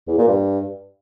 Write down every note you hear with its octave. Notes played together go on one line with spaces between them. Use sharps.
E2
A#2
G2